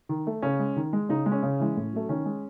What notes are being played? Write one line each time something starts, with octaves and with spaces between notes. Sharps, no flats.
D#3
A3
C#3 C#4
G#3
D#3
G#3
C#3 D#4
G#3
C#4
C#3
E3 G#3
A2
F#3 A3
D#3 C#4
G#3